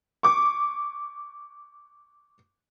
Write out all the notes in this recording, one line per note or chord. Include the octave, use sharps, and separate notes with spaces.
C#6 D6